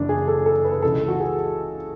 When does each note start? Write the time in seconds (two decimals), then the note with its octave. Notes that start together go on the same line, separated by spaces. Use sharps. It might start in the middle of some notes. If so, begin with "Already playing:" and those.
Already playing: F#1 F#2 E3 D4
0.09 G#4
0.28 A4
0.46 A4
0.65 B4
0.82 C#2 C#3 E3 A4
1.08 F#4
1.20 G#4